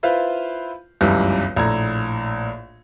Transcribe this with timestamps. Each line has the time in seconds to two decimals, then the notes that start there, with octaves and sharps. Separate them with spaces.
0.03 E4 F4 B4 C5 F5
1.01 G1 C#2 F#2 E3 G3
1.56 A#1 A2 A4 A#5 G#6